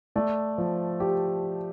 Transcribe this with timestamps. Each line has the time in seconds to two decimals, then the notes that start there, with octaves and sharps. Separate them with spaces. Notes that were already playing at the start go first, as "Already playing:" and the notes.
0.16 A3 D5
0.58 F3
1.00 G4